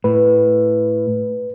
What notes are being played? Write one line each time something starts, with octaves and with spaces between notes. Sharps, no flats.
A2 B4